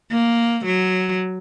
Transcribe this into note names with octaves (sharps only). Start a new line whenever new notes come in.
A#3
F#3